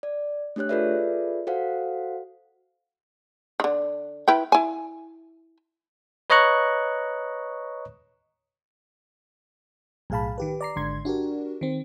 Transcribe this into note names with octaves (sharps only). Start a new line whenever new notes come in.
D5
A3 D4 G4 C#5 F#6
F4 G#4 A4 B4 D5 E5
F#4 A4 C5 F5 F#5
D3 D#3
E4 B4 G5
E4 G#5
B4 C#5 D#5 A#5 C#6 F#6
B1 A2 G#4 F5 A5 B5
D#3 G4 B4
D5 A#5 C7
G#1 G#2 D3 C6 G#6
D4 F#4 G4 A#4
D#3 C4